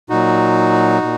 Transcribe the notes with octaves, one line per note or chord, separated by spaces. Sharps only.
A#2 F#3 D#4 F#4
A#2